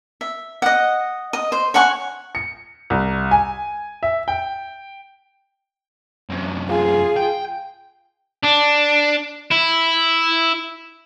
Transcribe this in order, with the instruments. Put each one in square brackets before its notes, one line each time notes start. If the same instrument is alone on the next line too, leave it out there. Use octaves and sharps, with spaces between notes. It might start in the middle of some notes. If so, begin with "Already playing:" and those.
[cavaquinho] E5
D#5 F#5
D#5
C5
C#5 F#5 G#5 C#6
[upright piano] C#7
C2
G#5
E5
G5
[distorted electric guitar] F#2 C3
[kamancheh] F4 G#4
[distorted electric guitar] G5
D4
E4